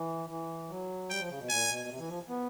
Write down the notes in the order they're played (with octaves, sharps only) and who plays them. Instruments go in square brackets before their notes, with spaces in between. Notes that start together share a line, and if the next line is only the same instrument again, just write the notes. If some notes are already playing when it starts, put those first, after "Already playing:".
Already playing: [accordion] E3
E3
F#3
[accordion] G3 [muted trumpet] G5
[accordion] F3
C#3
B2
[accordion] A#2 [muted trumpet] G#5
[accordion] B2
C3
E3
F3
B3